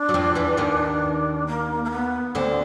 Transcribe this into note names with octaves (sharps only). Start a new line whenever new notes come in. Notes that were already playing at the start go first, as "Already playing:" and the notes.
Already playing: D4
F#3
F2 F3
E2 E3
D#2 D#3
A#3
A#3
B3
D2 D3 C4